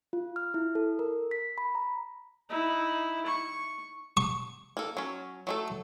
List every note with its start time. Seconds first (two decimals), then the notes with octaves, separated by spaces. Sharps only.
0.13 F4
0.36 F6
0.54 E4
0.75 A4
0.99 A#4
1.31 B6
1.58 B5
1.75 A#5
2.50 D#4 E4
3.26 C#6
4.17 C#6
4.77 A#3 A4
4.97 F#3 C#4
5.47 F#3 A3 A4